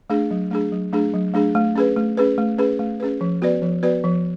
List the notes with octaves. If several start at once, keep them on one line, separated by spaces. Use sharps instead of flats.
A3 D4 G#4
F#3
A3 D4 G#4
F#3
A3 D4 G#4
F#3
A3 D4 G#4
A3
C#4 G#4 B4
A3
C#4 G#4 B4
A3
C#4 G#4 B4
A3
C#4 G#4 B4
F3
B3 F#4 B4 D5
F3
B3 F#4 B4 D5
F3